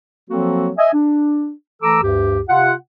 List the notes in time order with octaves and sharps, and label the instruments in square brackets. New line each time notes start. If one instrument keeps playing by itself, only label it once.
[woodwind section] F3 F#3 A#3 C4 F#4 A4
D#5 E5 G#5
D4
E3 A3 A4 A#5 D6 E6
D2 G2 G4
C3 F4 F#5